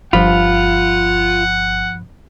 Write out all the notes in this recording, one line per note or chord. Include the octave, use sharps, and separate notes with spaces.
G1 G2 F3 F4 F#5 B5